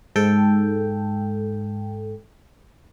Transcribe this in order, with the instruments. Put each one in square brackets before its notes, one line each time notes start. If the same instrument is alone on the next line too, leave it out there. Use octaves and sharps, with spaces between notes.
[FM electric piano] G#2 A4 G5